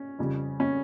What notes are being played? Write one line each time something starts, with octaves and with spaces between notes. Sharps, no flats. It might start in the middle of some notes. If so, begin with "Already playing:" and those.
Already playing: C#4
F2 C#3 G3
C#4